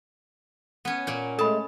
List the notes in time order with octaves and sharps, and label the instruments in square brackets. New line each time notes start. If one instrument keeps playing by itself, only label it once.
[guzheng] B3 C#4
A#2 A#3
[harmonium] G#3 A3 [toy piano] A4 B5 [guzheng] A5